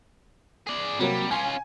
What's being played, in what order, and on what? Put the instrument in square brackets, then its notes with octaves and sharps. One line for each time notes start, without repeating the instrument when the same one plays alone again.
[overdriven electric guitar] G#4 D5
[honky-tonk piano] C3 F#3 A#3 [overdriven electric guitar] G3
[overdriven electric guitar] C#4 F4 [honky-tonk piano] G#5